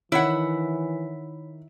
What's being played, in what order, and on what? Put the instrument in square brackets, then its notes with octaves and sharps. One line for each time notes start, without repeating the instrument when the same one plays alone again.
[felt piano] D#3 [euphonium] E3 [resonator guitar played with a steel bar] E4 F#5 [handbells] C#5 B5